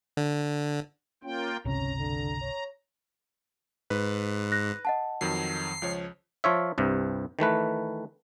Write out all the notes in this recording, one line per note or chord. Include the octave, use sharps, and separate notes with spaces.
D3
A#3 C#4 F4 G5
G1 C#2 C3 C#4 A#5
D3
C#5
G#2 B4
F#6 A#6
D#5 F#5 A5
F2 D#3 F#3 C7
C#2 F3 C#5
F3 F4 C#5 E5
C2 G2 C3
D#3 E3 A3 B4